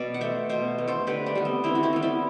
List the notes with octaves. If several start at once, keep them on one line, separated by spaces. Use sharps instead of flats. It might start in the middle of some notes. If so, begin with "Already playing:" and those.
Already playing: B2 D5
F#5
A3 C5 E5
B2 C5 E5
A3
A4 C5
D3 G4 B4
D4
G3 B3
C4
D3 C4 E4
F#4
C4 E4
G3 B3
C4 E4